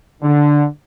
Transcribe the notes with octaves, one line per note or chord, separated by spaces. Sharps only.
D3